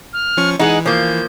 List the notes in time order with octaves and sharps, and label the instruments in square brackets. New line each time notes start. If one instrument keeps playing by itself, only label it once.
[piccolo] F6
[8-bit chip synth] F3 C#4 C#6
[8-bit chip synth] E3 [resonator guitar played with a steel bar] G#3 D#4 [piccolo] F#5
[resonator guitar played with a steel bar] F3 A#3 [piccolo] G6